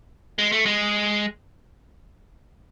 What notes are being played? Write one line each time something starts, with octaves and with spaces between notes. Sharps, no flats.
G#3
A3
G#3